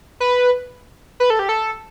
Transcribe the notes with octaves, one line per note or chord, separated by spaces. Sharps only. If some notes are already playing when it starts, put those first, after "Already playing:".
B4
B4
A4
G4
A4